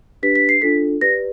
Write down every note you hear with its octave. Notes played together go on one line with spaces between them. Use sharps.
D4 G4 B4 B6
B6
C7
D4 F4 A4 B6
G4 B4 D5 A#6